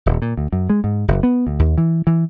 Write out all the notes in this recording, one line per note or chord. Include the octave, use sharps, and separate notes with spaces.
D#1
A#2
D2
F#2
G#3
G#2
F#1
B3
D2
D#2
E3
E3